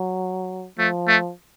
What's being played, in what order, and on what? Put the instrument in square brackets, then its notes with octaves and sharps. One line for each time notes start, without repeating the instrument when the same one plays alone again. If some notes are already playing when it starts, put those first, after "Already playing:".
Already playing: [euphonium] F#3
[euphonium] F3 [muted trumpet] A3
[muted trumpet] A3